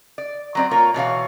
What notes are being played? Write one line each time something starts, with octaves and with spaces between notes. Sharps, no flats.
D5
F#3 C4 D5
A#3 F4 A#4 C#5
B2 E3 C#5 F5